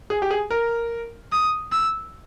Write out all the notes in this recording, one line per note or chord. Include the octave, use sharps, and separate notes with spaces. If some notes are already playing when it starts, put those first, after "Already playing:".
G#4
G4
G#4
A#4
D#6
E6